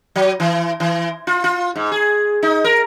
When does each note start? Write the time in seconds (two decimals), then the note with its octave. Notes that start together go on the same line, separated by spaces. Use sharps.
0.16 F#3
0.40 E3
0.80 E3
1.27 F4
1.44 F4
1.76 G#2
1.92 G#4
2.43 D#4
2.64 A#4